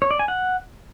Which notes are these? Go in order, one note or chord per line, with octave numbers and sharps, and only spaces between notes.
C#5
D5
G#5
F#5